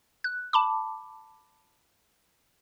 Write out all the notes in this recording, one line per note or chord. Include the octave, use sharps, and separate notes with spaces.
F#6
A5 B5 D6